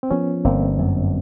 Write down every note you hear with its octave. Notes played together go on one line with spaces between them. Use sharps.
C4
F3 B3 C#4
G1 A#3 C4
F#2